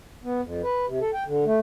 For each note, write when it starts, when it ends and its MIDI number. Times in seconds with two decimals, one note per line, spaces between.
0.24 0.41 59
0.42 0.62 41
0.63 0.86 71
0.87 0.99 48
1.01 1.11 69
1.14 1.24 79
1.26 1.45 50
1.46 1.59 57